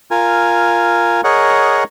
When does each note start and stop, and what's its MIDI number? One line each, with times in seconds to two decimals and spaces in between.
0.11 1.21 65
0.11 1.21 70
0.11 1.21 80
1.24 1.84 68
1.24 1.84 70
1.24 1.84 73
1.24 1.84 75
1.24 1.84 78